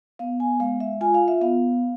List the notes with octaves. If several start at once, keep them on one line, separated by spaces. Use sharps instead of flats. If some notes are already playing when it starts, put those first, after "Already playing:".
B3 F5
G#5
G#3 F5
E5
F4 G#5
F5
E5
B3 F5